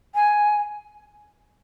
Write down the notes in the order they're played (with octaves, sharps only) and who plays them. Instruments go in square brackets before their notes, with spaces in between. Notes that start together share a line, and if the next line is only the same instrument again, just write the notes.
[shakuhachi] G#5